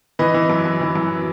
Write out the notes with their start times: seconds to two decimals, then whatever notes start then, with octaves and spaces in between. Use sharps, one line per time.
0.19 E3 B4 D#5
0.34 E3
0.50 F#2
0.65 F#2
0.81 E3
0.95 F#2